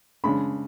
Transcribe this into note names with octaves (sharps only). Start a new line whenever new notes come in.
C#3 G#3 D4 B5